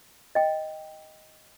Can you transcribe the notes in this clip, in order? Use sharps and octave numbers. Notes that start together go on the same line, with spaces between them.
D#5 G5